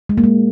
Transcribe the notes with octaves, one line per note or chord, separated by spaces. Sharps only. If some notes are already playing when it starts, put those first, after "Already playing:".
G#3
A#3
G#3